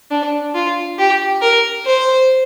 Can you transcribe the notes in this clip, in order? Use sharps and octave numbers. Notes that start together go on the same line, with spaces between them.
D4
F4
G4
A#4
C5